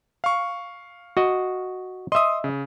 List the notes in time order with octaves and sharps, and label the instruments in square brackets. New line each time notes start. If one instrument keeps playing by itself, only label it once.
[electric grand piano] F5 C#6
[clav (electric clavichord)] F#4 D#5
[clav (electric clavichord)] D#5 E5 [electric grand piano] C6 D#6
[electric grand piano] C#3